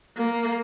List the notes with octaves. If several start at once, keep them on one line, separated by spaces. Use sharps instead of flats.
A#3